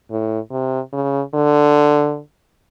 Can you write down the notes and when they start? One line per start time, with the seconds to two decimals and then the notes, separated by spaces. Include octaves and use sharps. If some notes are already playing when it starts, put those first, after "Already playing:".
0.11 A2
0.51 C3
0.93 C#3
1.34 D3